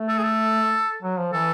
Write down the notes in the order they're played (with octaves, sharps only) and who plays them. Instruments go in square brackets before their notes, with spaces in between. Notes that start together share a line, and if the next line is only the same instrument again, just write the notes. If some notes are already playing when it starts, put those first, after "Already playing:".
Already playing: [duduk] A3
[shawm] A4
G#4
A4
[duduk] F#3
F3
[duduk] E3 [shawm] A4